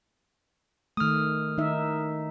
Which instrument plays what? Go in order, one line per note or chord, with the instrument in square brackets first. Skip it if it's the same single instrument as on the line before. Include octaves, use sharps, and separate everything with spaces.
[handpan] D#3 A3 [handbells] D#6 F6
[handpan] D#3 D#4 E5